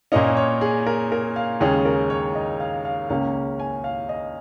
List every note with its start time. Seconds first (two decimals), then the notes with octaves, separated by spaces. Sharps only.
0.12 A#2 A#3 C#4 D#5
0.37 C#5
0.61 G#4
0.87 A#4
1.12 A#4
1.36 F5
1.61 D#2 C#3 G#3 C#4 G#4
1.85 A#4
2.10 C#5
2.35 D#5
2.60 F5
2.85 F5
3.10 C#2 C#3 A#3 C#4 F5
3.60 G#5
3.84 F5
4.09 D#5